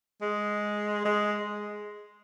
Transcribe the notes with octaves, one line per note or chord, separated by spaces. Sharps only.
G#3
G#3